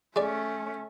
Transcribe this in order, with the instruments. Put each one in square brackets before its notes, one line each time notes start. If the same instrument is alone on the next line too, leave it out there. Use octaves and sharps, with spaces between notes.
[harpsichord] G#3 D5 [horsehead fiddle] A3 C#4